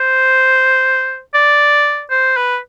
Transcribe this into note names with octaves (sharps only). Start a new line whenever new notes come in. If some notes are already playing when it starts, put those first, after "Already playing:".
Already playing: C5
D5
C5
B4